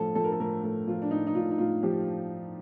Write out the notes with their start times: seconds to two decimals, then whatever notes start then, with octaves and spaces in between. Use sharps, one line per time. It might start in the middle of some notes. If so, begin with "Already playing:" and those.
Already playing: A2 F3 A4
0.15 F3 A4
0.24 A#4
0.32 A4
0.40 A2 A#4
0.63 A2 A4
0.87 F3 F4
1.02 D4
1.11 A2 D#4
1.27 D#4
1.35 A2 F4
1.51 D#4
1.58 A2 F4
1.83 F3 G4